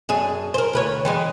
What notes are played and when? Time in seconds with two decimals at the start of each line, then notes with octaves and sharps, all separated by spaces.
0.09 F#2 D4 G#4
0.54 A#4 C5
0.73 D2 B4 C#5
1.05 E3 G3 G#3